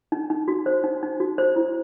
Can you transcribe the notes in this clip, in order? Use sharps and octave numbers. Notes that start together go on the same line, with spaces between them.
D#4
D#4
F#4
C5
D#4
D#4
F#4
C5
E4